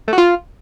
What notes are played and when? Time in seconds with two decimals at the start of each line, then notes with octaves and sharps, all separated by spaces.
0.08 A3
0.13 F#4
0.18 F4